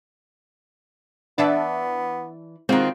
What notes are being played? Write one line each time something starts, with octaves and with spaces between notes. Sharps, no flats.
E3 B3 D4 D5 E5 A5
D#3 G#3 C4 F4 F#4